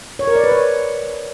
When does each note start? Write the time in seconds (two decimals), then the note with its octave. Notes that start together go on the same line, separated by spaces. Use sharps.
0.19 C#5
0.27 A#4
0.36 D5
0.44 B4
0.52 C#5